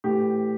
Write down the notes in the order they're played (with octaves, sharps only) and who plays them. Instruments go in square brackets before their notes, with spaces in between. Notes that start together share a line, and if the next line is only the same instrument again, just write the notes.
[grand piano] A2 E3 G4